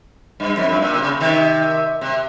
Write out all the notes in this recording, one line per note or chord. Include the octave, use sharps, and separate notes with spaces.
G2
F2
G2
A#2
C3
C#3
C3 D#3
C3